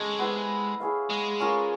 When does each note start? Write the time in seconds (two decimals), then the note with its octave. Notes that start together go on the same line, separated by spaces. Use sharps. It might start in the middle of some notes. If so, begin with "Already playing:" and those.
Already playing: G#3 C#4 A4 C#5
0.19 B3 E4 G4 C5
0.80 E4 G#4 C#5 F5
1.10 G#3
1.40 C#4 F4 A#4